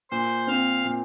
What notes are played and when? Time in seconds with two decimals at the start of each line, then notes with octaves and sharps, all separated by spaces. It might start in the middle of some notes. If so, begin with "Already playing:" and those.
0.11 A#2 C5
0.47 C4 F5
0.85 A#2